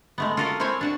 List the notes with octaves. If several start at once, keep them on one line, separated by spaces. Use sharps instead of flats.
G#3 A3 B3
F4 F#4 A4 A#4 D#5 F5
C4 E4 C5 C#5 G#5
D4 F#4 A5